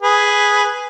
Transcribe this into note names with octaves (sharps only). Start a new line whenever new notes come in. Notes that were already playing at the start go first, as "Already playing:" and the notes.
G#4 B4